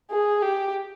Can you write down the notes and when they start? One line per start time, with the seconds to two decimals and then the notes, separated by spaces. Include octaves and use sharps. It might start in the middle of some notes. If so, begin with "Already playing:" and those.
0.11 G#4
0.42 G4